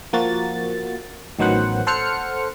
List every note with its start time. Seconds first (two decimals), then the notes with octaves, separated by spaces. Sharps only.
0.13 F3 A#3 F#4 A6
1.39 A1 D#3 F#3 B3 C5 F#5
1.87 A4 C5 F#5 F6 C#7